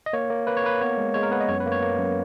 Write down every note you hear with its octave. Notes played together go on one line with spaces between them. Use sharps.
D#5
A#3 C#5
A#3
A#3 B4
C#5
A#3 B4
B3 C#5
G#3
G#3 C#5
A#4
B3 B4
D#5
F#2 C#5
B4
A#3
C#5
A#3
F#2